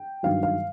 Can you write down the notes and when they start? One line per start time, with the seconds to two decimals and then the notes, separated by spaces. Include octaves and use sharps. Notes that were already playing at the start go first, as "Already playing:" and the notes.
Already playing: G5
0.23 G2 D#3 F#3 F5
0.43 F5